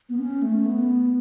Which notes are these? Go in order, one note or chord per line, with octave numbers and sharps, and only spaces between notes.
B3
C#4
A3
B3